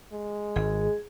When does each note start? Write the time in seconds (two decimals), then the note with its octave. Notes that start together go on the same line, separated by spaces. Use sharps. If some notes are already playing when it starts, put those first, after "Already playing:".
0.12 G#3
0.56 G#1 G#4